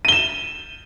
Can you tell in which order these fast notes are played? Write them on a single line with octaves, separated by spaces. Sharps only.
D#7 G7 E7